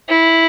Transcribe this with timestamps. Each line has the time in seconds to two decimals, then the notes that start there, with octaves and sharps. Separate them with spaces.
0.09 E4